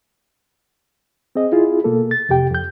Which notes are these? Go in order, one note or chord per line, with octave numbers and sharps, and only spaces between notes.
C4 G#4 D#5
E4 F4 G#4
B2 A#3 A4
A6
F2 C3 G4 G5
F2 G6